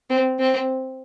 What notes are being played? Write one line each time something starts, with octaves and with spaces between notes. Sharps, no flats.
C4
C4